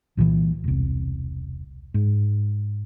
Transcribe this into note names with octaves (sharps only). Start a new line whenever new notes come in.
C2 A#2 C#3 E3
E1 C2
G#2